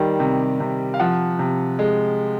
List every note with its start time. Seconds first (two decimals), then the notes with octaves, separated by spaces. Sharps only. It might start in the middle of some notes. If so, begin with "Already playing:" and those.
Already playing: D#3 G3
0.20 C3
0.60 C3
0.94 F5
1.00 F3 F#5
1.39 C3
1.79 G#3